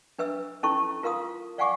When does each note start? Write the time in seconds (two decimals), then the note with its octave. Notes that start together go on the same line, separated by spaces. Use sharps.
0.19 D4 B4 E5 E6
0.63 C#4 D#4 E4 A4 C#6
1.03 F4 A#4 F5 C6 D#6
1.58 D5 F5 F#5 G#5 C#6 D6